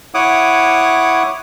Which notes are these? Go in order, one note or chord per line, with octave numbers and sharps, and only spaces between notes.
E4 C#5 F#5 D6 D#6